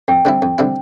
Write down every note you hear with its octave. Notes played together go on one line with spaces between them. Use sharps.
F2 G5
D3 G3 C4 E4
F2
D3 G3 C4 E4